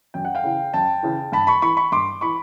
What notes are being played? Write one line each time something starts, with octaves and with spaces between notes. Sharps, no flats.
F#2 G5
F#5
F5 G5
C#3 E3
F#2 G5 A5
C#3 E3
G2 A5 B5
B5 C#6
E3 B5 C#6
B5 C#6
G2 C6 D6
E3 B5 C#6